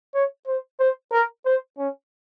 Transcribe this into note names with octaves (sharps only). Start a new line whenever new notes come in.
C#5
C5
C5
A#4
C5
C#4